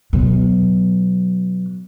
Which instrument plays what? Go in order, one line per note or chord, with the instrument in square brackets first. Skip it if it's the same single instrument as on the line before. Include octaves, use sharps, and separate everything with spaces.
[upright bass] B2 F#3